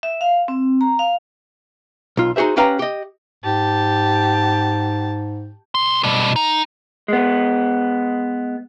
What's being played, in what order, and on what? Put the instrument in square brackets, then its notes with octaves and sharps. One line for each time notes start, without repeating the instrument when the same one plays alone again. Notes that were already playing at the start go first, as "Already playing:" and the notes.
[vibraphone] E5
F5
C4
A#5
F5
[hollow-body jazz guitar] B1 F4
D#4 F#4 G#4 C5 E5
C#4 G4 B4 F5 G5 A#5
G4 D#5
[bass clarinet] G#2 [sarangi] G4 [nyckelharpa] A5
[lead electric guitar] B1 C6
B2 G3
D#4
[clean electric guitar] G#3 B3